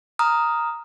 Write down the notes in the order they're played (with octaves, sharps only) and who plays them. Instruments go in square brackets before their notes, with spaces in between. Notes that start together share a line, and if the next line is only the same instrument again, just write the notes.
[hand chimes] A#5 D#6 F6